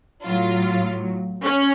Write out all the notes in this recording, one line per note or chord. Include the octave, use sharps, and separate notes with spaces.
A2 F#3 F4
C#4